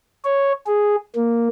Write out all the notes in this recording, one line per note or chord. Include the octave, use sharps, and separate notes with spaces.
C#5
G#4
A#3